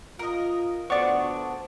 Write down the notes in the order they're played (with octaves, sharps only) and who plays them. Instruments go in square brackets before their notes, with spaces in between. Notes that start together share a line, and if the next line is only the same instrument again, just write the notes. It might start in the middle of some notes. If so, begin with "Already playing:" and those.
[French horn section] F4 [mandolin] A#4 D#5
[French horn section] D2 [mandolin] B3 D4 [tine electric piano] C5 [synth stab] D5 C#6